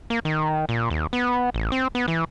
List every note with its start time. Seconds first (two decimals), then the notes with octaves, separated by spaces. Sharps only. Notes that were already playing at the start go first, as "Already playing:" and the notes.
0.10 A#3
0.25 D#3
0.69 A#2
0.90 D#2
1.13 B3
1.54 A1
1.72 C4
1.95 B3
2.08 E3